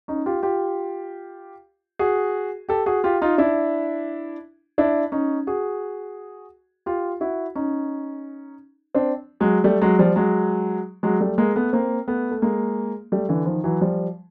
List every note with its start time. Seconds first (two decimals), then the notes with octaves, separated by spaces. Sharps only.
0.08 C#4 D#4
0.26 F4 G4
0.43 F4 G4
1.99 F#4 G#4
2.69 G4 A4
2.86 F#4 G#4
3.04 F4 G4
3.22 D#4 F4
3.38 D4 E4
4.78 D4 E4
5.12 C#4 D#4
5.47 F#4 G#4
6.86 F4 G4
7.21 E4 F#4
7.55 C#4 D#4
8.95 C4 D4
9.40 F#3 G#3
9.64 G3 A3
9.82 F#3 G#3
9.99 F3 G3
10.16 F#3 G#3
11.03 F#3 G#3
11.20 G3 A3
11.38 G#3 A#3
11.56 A3 B3
11.73 A#3 C4
12.08 A3 B3
12.31 A3
12.42 G#3 A#3
13.12 G3 A3
13.29 D3 E3
13.46 D#3 F3
13.64 E3 F#3
13.81 F3 G3